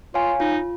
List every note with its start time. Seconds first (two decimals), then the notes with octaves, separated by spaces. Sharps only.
0.14 F4 C#5 F5 G#5
0.40 D#4 F4